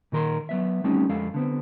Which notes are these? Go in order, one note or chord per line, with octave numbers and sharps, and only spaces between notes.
A#2 D#3 A#4 B5 C6
F#3 B3 E5
G3 A3 C4 C#4 D#4 G4
F2 G#3 A4 F5
D3 B3 C4